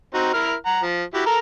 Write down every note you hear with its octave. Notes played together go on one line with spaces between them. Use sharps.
C4 D#4 F#4
E4 A#4 F6
F#5 A#5
F3
E4 F#4 G4
A4 A#4 A#5